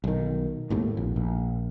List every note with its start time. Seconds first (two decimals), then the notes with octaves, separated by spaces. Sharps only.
0.04 B1 D#3
0.70 G#1 D#2 A2
0.97 A#1
1.16 A#1